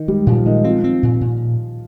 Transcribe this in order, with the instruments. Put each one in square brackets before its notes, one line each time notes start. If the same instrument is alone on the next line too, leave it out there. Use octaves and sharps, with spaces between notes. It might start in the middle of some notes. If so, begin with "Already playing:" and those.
Already playing: [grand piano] D#3 D#4
[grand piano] G3 G4 [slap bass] G#3
[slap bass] A#2 [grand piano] F3 F4
[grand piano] D#3 D#4 [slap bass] G#3
[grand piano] F3 F4 [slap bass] C4
[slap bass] C4
A#2
A#2